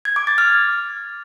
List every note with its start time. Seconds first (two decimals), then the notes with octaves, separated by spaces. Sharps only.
0.05 G#6
0.16 D6
0.27 A6
0.38 F6